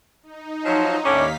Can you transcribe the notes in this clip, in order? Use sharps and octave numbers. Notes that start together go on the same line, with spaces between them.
D#4
F3 F#3
D#2 A2 C#4 D4 F5 B6